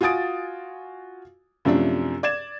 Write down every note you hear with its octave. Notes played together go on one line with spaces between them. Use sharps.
F4 F#4 G#5 D#6 A6 D7
F#2 C3 F3 A3 D4
D5 G#6 E7